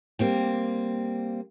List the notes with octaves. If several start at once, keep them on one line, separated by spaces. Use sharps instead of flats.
G3 A#3 C4